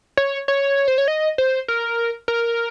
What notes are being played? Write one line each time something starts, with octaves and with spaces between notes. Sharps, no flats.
C#5
C#5
C5
C#5
D#5
C5
A#4
A#4